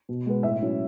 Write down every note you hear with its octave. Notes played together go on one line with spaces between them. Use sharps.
B2
G#3 B3
A2 E5
F#3 C#4 E4